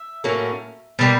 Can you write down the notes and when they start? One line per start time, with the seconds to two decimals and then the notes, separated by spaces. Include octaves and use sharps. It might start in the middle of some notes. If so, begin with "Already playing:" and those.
Already playing: E5
0.24 A2 F#3 A#3 C#4
0.99 B2 G3 A#3